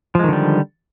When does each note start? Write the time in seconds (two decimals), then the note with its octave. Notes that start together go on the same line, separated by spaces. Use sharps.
0.15 F3
0.19 G#3
0.24 D#3
0.28 D3
0.33 G3